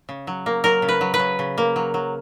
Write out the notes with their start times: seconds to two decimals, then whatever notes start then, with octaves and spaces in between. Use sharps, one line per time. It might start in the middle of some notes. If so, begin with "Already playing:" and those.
0.09 C#3
0.27 F#3
0.46 A#3
0.64 F#3 A#4
0.82 C#3
0.89 B4
1.01 F#3
1.14 B4
1.19 C#3
1.39 C#3
1.58 A#3
1.76 F#3
1.94 F#3